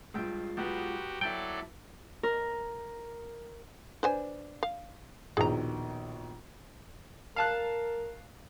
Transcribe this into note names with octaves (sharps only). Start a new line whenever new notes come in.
G2 G#3 F4 G5 E6
B1 B3 F#4 G4
F#2 F#3 E4 A4 D5 G5
A#4
D4 B4 C5 G#5
F5
A#1 D#2 B2 G#4 A#5
A#4 F5 A5 F#6